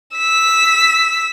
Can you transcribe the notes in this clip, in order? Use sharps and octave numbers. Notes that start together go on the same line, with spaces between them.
E6 B6